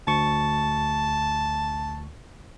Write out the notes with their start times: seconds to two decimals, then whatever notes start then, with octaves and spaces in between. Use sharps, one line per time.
0.07 D2 A5 C#6